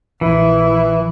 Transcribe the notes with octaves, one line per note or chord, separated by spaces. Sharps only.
A#1 E3 E4